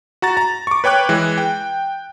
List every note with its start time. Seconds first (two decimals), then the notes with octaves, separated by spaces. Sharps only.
0.22 F#4 A#5 A6
0.37 A#5
0.67 C#6 D6
0.84 B4 C#5 G5 D6 F#6
1.09 E3 G#3
1.38 G5